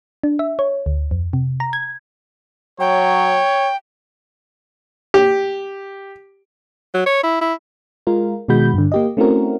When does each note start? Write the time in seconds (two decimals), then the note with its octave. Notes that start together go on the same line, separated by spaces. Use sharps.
0.24 D4
0.39 E5
0.59 C#5
0.86 D2
1.11 F2
1.33 C3
1.60 A#5
1.73 G#6
2.80 F#3 C#5 G5
5.14 G4
6.95 F#3
7.06 C#5
7.24 E4
7.41 E4
8.07 G#3 F4 A#4
8.48 B2 D#3 G#3 F#4 B5 G6
8.74 G2 D3
8.92 A#3 G4 D#5
9.17 A3 C4 C#4 E4 F#4 A#4